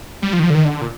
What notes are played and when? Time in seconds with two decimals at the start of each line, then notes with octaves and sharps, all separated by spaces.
0.22 G3
0.33 F3
0.40 D#3
0.44 F3
0.50 D3
0.55 D#3
0.65 D3
0.82 A#2